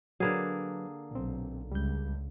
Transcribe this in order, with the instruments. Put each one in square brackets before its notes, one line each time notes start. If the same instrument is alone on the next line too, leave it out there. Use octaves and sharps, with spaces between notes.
[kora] D3 A#3 G#4 [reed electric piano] F#3 B4
[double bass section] B1 [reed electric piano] A#2 C4
[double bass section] C#2 [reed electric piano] G3 G6